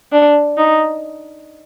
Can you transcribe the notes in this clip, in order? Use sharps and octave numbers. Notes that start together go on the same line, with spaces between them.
D4
D#4